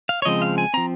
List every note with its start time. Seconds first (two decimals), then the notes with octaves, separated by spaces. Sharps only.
0.09 F5
0.22 C#5
0.25 C#3 F3 G#3 C4 D#5
0.42 F5
0.58 G#5
0.74 F3 C4 A#5